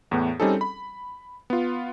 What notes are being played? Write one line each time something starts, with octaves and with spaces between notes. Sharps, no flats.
E2 A2 B3
G3 C4 C#4 D#4 G#4 A4
B5
B3 F4